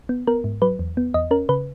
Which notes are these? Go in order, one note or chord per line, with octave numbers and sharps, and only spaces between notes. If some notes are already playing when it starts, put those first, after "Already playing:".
B3
B3 A#4
G#2
F#3 B4
E2
B3
E2 D#5
C#4 A#4
C#3 B4